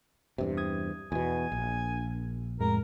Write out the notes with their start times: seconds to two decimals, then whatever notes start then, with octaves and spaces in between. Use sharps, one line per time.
0.38 E2 G2 C3
0.57 D#6 G#6
1.12 E2 B2 G#5
1.52 A#1
2.60 F2 A2 G#3 A#4